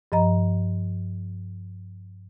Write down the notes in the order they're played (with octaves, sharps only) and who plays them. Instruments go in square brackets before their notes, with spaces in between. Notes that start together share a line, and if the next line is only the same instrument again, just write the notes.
[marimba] G2 F3 D#5 A#5